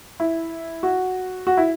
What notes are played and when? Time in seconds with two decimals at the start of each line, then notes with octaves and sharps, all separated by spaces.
0.20 E4
0.83 F#4
1.47 F#4
1.57 E4